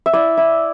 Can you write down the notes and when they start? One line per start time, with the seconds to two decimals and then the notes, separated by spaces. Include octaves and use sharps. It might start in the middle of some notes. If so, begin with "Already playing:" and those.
0.06 E5
0.13 E4 D5
0.37 E4